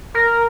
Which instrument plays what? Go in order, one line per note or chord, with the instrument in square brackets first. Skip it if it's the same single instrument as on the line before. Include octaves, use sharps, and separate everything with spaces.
[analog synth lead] A#4